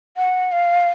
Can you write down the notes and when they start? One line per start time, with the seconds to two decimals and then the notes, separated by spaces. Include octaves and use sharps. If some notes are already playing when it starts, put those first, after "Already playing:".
0.17 F#5
0.52 F5